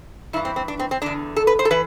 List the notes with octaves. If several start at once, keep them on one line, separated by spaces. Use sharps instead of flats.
G2 E3 E4
C4
C4
D4
C4
C4
E2 D3 D4
A4
B4
C5
A4
E3 B4